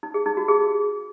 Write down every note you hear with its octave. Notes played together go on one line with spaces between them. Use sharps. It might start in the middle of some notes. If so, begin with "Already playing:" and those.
D#4
G#4
D#4
F#4
G#4